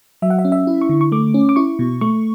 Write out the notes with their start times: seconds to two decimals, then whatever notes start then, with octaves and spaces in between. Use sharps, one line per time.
0.22 F#3 E5
0.30 F#5
0.39 E5
0.45 C#4
0.52 E5
0.67 E4
0.81 C#6
0.89 D3
1.01 C#6
1.12 A3 D6
1.34 C#4
1.49 D6
1.56 E4 C#6
1.79 B2
2.01 A3 C#6